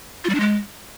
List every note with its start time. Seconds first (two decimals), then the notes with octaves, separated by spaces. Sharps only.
0.24 F4
0.30 G3
0.35 D4
0.40 G#3